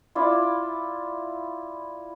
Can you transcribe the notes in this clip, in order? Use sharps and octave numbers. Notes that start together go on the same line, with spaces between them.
E4 F4 D5